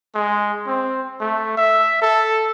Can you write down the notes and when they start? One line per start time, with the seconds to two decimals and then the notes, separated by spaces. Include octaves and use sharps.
0.15 G#3
0.66 C4
1.20 A3
1.57 E5
2.02 A4